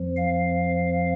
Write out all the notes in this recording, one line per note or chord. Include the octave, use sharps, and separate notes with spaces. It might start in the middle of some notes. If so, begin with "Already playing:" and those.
Already playing: F2 F3
F5